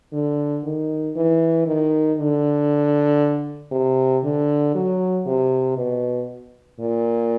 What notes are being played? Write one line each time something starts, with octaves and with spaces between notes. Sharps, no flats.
D3
D#3
E3
D#3
D3
C3
D3
F#3
C3
B2
A#2